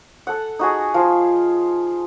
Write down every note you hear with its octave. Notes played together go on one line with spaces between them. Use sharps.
A4 F#5
D#4 F#4 G#4
F3 F5